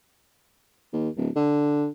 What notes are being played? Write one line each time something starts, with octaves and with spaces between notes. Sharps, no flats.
D#2
D1
D3